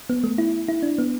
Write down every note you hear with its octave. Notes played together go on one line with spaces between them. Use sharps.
B3
A3
E4
E4
D4
B3